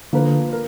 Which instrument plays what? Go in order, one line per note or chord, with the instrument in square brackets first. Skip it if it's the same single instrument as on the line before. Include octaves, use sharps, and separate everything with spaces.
[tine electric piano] D3 [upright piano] F3 A#3 F4 B4
[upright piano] A#4